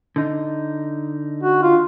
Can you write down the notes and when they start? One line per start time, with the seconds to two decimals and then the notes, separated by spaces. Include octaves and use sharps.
0.16 D3 D#4
1.43 F#4
1.63 F4